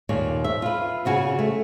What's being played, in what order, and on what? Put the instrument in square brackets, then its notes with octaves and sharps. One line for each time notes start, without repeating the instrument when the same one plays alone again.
[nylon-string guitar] D#2 A#2 C#5 D5
E5
F4 B4
A#2 C#3 F#4 G#5
A3